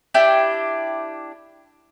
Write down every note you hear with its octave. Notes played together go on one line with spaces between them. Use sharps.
D4 E4 G4 G6